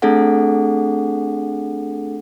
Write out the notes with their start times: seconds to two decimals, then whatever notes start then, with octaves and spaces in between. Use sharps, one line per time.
0.02 A3 C4 D4 G#4 A4 F#5